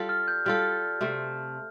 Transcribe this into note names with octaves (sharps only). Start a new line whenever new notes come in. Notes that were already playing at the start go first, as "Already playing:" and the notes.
Already playing: G3 F4 A4
F6
G6
G3 F4 A4 F6
C3 A3 C4